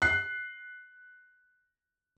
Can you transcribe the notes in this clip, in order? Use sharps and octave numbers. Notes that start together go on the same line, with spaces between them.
F#6 C7